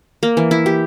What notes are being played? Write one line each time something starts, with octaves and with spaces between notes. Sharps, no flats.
A#3
E3
E4
G4